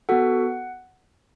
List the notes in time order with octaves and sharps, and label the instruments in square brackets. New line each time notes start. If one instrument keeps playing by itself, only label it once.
[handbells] B3 F#4 A4 F#5